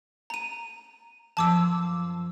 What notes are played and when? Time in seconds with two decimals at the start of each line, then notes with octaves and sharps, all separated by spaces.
0.30 A#5 D#7
1.37 F#2 F3 C5 A5 D6 E6